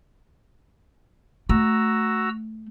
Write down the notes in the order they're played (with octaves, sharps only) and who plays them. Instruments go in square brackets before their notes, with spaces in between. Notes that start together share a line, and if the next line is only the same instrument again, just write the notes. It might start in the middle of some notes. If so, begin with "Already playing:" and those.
[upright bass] A3 [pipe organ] F#4 A#5 E6